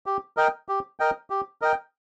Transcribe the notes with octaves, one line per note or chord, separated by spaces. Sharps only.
G4
A#4 D#5 G5
G4
A#4 D#5 G5
G4
A#4 D#5 G5